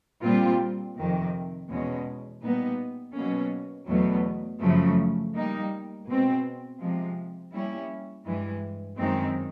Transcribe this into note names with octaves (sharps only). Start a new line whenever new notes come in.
A#2 G3 C4 F4
F2 C3 D#3
E2 B2 G#3 C#4
A#2 G3 B3 D#4
B2 F#3 A#3 C#4
E2 B2 F#3 A3
F#2 C#3 F3 A3
G3 A#3 D#4
B2 G#3 C4
C3 F3 G#3
G3 A#3 C#4 E4
G2 E3 G#3
F#2 D#3 G#3 C4 D#4